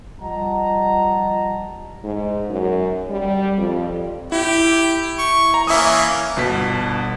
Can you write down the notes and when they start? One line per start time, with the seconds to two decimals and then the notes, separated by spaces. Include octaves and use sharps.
0.21 F3 G3 D#5 F#5 A5 A#5
2.04 G#2
2.49 F#2
3.10 G3
3.58 F2
4.32 E4 G4
5.19 C#6
5.54 A#5
5.67 E3 A#3 C#4 E5 D#6
6.36 G1 B2 B6